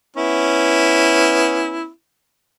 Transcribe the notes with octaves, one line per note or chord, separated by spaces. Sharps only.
B3 C#4 E4